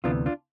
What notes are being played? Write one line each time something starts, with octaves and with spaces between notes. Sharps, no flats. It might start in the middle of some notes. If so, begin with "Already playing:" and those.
D2 C3 E3 B3 D4 F4
D4 F4